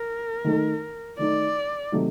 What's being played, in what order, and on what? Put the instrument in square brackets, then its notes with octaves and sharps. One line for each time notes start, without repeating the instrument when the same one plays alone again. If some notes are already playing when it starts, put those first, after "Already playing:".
Already playing: [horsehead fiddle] A#4
[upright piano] D#3 A3 D#4
[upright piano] D#3 A3 D#4 [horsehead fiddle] D5
[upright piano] C3 D#3 F#3 A3 D#4